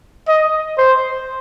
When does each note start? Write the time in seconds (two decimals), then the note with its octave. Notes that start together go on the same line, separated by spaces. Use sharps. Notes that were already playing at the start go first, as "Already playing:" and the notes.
0.28 D#5
0.78 C5